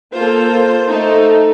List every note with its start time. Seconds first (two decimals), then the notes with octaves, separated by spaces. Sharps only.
0.13 A#3 F4 A4 C5
0.89 A3 D#4 A4